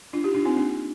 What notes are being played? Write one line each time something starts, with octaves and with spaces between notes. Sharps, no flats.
D4 F4
D#4 G4
D4 F4
C4 D#4
A#3 D4